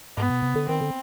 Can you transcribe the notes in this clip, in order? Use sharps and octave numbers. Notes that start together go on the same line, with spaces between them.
G#2 B3
B2
C3
D3
D#3 C4
D3